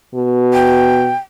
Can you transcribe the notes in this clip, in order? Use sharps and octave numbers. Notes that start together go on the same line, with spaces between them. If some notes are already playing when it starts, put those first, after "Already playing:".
B2
G5